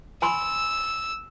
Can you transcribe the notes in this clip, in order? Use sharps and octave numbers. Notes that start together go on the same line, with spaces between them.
G#5 B5 C6 E6